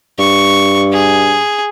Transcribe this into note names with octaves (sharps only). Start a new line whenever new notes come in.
G2 C#6
G#4